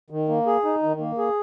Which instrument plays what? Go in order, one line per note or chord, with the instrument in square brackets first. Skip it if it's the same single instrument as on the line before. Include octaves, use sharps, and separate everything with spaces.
[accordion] D#3
A#3
G#4
D#4
D#3
A#3
G#4